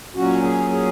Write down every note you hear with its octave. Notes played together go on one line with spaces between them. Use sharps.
A#2 F#3 C#4 F#4
G#4
G#4